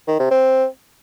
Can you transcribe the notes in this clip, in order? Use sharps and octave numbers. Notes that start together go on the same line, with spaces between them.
D#3
C3
C4